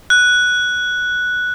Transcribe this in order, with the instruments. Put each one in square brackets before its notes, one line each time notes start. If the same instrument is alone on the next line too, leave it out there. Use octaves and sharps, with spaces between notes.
[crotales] F#6